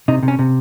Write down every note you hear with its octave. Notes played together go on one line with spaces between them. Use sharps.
C3 D#4
C3
C#4
C3